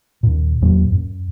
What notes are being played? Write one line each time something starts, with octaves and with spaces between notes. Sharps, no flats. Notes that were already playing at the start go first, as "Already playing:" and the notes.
D#2 A#2
E2 A#2 F#3 A#3
F#2